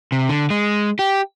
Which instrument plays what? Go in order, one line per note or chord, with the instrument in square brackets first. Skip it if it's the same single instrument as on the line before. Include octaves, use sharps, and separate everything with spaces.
[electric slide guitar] C3
D3
G#3
G4